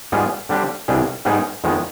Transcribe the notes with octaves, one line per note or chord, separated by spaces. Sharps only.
G#2 G3 B3 F4 G#4
D3 G3 D4 G4 C5
C2 B2 G3 D4 G#4
G#2 G3 B3 D#4 G#4
F2 D#3 G#3 B3